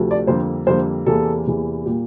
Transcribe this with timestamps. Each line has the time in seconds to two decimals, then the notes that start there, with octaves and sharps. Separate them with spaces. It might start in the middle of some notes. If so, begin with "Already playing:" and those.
Already playing: D2 C3 F3 A3
0.11 D5
0.27 F2 D3 G3 A#3 C5
0.67 F2 D3 G3 A#3 C5
1.06 E2 C3 E3 A#3 A4
1.46 E2 C3 E3 A#3
1.86 A#2 G3 A#3 G4